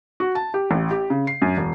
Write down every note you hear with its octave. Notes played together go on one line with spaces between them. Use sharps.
F#4
A5
G4
A1
G4
C#3
C7
F#2
E1